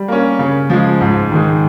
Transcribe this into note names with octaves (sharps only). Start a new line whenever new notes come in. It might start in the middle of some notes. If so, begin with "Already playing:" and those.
Already playing: G3
A#3 C#4
C#3
F3 G#3
G#2
D#3 G#3